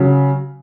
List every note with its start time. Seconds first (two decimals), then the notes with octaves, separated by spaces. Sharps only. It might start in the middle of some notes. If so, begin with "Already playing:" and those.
Already playing: C#3 F#3